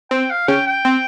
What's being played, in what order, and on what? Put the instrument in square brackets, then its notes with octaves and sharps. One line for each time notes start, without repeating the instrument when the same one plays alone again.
[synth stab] C4 [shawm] G5
[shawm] F5
[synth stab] C#3 C#4 [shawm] G5
[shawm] G5
[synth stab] C4